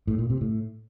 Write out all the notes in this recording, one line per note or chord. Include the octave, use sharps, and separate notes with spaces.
A2
A#2
C3
A2